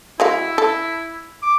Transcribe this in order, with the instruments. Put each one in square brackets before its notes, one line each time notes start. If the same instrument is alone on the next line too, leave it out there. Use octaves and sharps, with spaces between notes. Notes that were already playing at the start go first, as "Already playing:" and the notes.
[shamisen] G#3 F#4 F5 [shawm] E4
[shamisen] A4
[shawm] D6